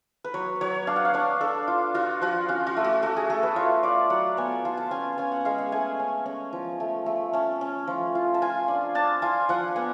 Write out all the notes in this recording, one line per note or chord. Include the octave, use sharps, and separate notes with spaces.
B4
F#3 C#5
F#3 C#5
D4 F5
F#5
F5
D4 C#5
D4 A4
F4
F4 F#4
F3 F#4
C#4 F4
F#4
A3
F#4
A3 F#4
G#4
A3 A4
B4
F4 C#5
F4 D5
F#3 F#5
B3 G#5
F4 A5
A5
C#4 G#5
C#4 G#5
F#5
G#3 F5
F#5
A3 G#5
C#4
C#4
F3
A3
A3
C#4 A5
C#4
F3
F4
A5
F4 G#5
D4
D4 A5
F4 G#5
F3 F#5
B3 G#5